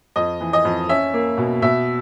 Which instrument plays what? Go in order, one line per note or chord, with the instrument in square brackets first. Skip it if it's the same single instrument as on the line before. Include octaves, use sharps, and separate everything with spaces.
[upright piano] F2 D#5
E3
D#5
F2
C#4 E5
A#3
B2
B2 E5